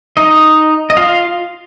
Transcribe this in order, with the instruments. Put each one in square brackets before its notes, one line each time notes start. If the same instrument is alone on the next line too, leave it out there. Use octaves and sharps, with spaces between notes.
[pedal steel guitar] D#4 D#5
D#5
F4 F5